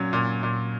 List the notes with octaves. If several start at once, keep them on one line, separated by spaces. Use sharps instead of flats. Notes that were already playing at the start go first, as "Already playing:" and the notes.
Already playing: A#2 F#3 C#4
A#2
A#2